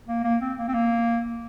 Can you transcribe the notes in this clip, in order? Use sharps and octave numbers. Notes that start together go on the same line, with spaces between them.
A#3
A#3
C4
A#3
C4
A#3